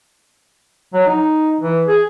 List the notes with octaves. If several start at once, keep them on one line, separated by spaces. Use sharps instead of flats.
F#3
D#4
E3
G#4